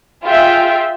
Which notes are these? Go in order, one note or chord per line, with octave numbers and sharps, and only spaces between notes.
F4 G#4 E5 G5